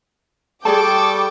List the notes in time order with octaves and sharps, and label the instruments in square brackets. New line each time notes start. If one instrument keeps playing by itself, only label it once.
[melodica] G3 C#6 [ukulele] G#4 D5 A5 [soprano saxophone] A4 [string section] G5 D6